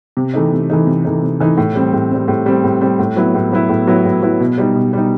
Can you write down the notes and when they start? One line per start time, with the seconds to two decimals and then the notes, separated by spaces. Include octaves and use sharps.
0.17 C3
0.34 E3 A3 D#4
0.52 C3
0.70 E3 A3 D#4
0.87 C3
1.05 E3 A3 D#4
1.22 C3
1.40 E3 A3 D#4
1.57 A2
1.75 G3 C4
1.93 A2
2.11 G3 C4
2.28 A2
2.46 G3 C4
2.64 A2
2.81 G3 C4
2.99 A2
3.16 F#3 B3 E4
3.35 A2
3.52 F#3 B3 E4
3.69 A2
3.87 F#3 B3 E4
4.05 A2
4.22 F#3 B3 E4
4.40 B2
4.58 G3 D#4
4.75 B2
4.93 G3 D#4